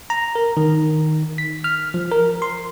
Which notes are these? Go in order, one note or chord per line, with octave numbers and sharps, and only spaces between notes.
A#5
A#4
D#3
B6
F6
F3
A#4
C6